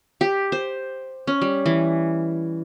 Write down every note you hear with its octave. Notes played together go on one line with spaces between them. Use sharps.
G4
C5
C#4
G3
E3